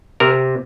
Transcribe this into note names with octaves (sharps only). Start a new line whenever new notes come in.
C3 A#4